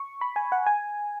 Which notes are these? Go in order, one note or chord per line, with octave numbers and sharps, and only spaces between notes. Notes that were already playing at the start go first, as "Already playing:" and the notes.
Already playing: C#6
B5
G#5
F#5
G#5